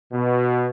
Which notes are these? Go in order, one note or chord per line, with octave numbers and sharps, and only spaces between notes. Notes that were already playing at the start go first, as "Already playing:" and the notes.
B2